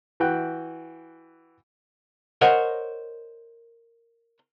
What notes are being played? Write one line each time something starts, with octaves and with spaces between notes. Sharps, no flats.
E3 F#4 G5 F#6
A#4 C5 C#5 D#5 F#5